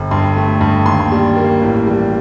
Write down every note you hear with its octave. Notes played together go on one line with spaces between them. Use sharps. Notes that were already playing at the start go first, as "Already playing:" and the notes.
Already playing: G1
G2 C6
A3
G2
D#2 C6
G3
A#3
A1
G3